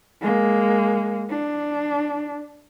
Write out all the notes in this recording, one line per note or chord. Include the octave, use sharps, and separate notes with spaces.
G#3 A#3
D4